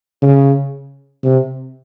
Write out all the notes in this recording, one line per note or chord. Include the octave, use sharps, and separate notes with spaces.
C#3
C3